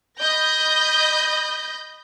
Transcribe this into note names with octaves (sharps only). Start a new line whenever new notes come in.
D#5 B5 G6 A#6